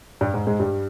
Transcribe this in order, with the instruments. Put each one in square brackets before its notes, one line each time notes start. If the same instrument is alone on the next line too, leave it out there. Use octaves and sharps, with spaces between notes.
[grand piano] G2 G3
G#2 G#3
G#2 G#3
G2 G3